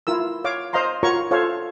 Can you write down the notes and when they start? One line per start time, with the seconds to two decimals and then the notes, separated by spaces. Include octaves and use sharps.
0.07 E4 F4 A#4 E6
0.44 C#5 F5 D6
0.73 C5 D#5 F5 A#5 C6
1.03 F4 F#4 A#4 C#5 A#5 C#6
1.31 F4 A4 C5 C#5 F5